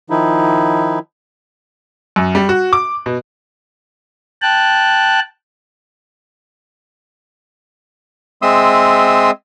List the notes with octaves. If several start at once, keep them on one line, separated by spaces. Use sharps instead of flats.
D#3 F3 D#4 E4
F#2
G3
F#4
D6
B2
G5 A5 F#6
G#3 C4 E5 C6 D#6 E6